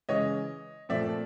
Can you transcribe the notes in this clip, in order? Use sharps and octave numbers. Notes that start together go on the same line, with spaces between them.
C#3 E3 G#3 C#5 D#5
A#2 F3 A3 C4 D5 E5